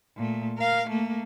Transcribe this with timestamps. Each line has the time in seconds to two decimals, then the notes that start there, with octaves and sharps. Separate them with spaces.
0.17 A#2 A3
0.58 A#4 F5
0.89 A3 A#3